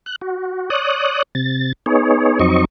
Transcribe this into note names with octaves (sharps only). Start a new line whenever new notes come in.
F#6
F#4
C#5 D5 D#6 F#6
C3 A6
B3 D#4 G#4 C#5
F2 F#3 C4 D#4 D#5 C#6